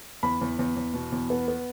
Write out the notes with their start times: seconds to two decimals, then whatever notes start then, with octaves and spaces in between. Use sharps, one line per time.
0.23 E2 B5
0.41 E2
0.59 E2
0.77 E2
0.94 B2
1.12 E2
1.30 B3
1.48 B3